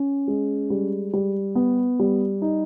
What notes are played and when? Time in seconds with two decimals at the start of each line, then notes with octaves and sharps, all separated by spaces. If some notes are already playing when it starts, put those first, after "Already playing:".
Already playing: C#4
0.28 G#3
0.70 G3
1.13 G3
1.55 B3
2.00 G3
2.42 D#4